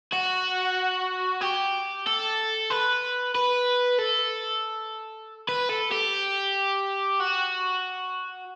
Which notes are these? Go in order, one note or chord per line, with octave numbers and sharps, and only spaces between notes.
F#4
G4
A4
B4
B4
A4
B4
A4
G4
F#4